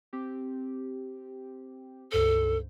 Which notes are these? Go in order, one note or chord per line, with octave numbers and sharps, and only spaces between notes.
C4 G4
C#2 G2 A4 C5